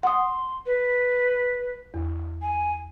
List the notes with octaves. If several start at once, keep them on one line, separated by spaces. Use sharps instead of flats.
F#5 C6 D#6
B4
E2
G#5